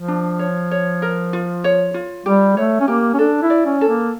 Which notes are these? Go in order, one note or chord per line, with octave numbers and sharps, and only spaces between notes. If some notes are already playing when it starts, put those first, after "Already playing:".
Already playing: F3
D4
C#5
C#5
A#4
F4
C#5
F4
G3 G4
A3 C#5
C#4
A#3 G4
C#4
D4 A4
E4
D5
C#4
A4
A#3